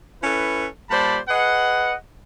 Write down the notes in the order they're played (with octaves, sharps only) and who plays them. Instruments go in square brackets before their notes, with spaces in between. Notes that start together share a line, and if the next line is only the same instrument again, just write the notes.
[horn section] C#4 E4 A4 B4
A#2 G3 C5 D5 A5 B5
G#4 B4 D#5 F#5